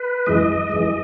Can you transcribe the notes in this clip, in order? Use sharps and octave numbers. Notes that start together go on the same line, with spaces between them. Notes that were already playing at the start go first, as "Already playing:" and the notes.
Already playing: B4
F#2 E3 G#3 D#5
F#2 E3 G#3